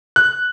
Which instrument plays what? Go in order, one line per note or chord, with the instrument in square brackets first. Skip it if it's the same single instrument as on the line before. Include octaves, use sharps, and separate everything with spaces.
[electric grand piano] F#6